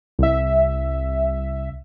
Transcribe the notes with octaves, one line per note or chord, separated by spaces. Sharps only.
C2 E5